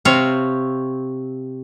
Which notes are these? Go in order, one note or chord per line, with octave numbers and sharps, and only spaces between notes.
C3 C4 C#5 F5